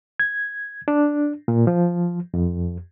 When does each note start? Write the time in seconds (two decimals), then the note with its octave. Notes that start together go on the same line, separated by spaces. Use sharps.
0.20 G#6
0.88 D4
1.48 A#2
1.67 F3
2.34 F2